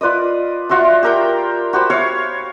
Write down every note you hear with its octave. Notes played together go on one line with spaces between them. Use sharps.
F4 B4 D5 D#5
F4 F#4 E5 C6
G4 A#4 G5
F#4 G4 C5 B5
C#5 F5 C#6